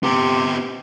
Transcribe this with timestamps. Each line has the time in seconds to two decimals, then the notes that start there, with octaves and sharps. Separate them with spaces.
0.03 C3 B3 G4